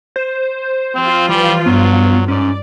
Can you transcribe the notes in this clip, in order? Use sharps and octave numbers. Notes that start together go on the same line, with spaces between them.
C5
F3 C4 F4
E3 G3
G2 F#3 B3
G#2 C#4 D5